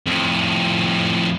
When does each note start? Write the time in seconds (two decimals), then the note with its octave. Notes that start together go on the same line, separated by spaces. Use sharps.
0.06 F2 A2